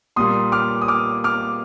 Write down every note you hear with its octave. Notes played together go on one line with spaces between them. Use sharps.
A#2 G3 A#3 C6 D#6
D6 F6
D#6
D6 F6
D6 F6